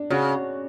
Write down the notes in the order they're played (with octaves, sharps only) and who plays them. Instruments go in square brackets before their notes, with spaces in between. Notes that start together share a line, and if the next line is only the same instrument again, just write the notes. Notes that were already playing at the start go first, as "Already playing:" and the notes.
Already playing: [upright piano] D4
[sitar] C#3 [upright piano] F#4